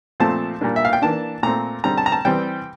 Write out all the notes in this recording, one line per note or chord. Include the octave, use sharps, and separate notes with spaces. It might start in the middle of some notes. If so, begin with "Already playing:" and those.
A#2 F3 A3 C4 A5
A#2 G3 A#3 D4
E5
F5
G5
E3 A#3 D4 A5
A#2 A3 C4 A#5
D3 G3 C4 A#5
A5
A#5
A5
E3 G3 C4 G5